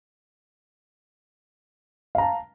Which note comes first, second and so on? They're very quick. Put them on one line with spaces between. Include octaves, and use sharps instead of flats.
F5 A#5 A5